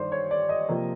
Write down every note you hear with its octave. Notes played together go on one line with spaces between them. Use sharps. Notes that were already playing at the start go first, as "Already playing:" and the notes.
Already playing: G2 D#3 C5 D5
C#5
D5
D#5
C3 F3 A#3